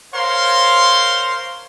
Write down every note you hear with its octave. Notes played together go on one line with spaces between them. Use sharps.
A#4 C5 C#5 F5 C6